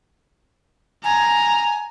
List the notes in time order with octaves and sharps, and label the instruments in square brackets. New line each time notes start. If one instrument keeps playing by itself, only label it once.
[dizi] G#5 [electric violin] A#5